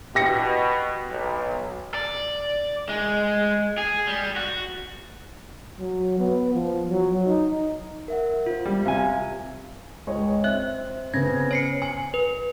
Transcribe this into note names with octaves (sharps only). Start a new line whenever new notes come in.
B2 G4 A#6 C#7
B1
D5
G#3
G#4
G3
F#4
F#3
B3
F3
F#3
D#4
A#4 E5 F#5
F4 C5
G3
C3 F5 G#5
C#2 G#3 C#5
C4 E5 F#6
C#3 B3 C4 G#6 A#6
C#5 C7 C#7
G#5 C#7 F#7
B4